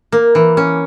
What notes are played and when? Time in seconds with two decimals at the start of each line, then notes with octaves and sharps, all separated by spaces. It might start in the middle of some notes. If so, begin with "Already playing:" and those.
0.12 A#3
0.35 E3
0.57 C#4